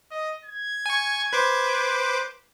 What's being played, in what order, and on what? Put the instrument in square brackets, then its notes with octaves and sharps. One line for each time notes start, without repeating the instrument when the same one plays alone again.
[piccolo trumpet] D#5
G#6
[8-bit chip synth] G#5 C#6
B4 C5 D6